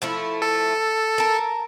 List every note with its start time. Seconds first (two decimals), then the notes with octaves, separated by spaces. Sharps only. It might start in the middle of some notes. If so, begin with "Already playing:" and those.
0.02 F3 A3 E4
0.42 A4
1.18 A#4 A5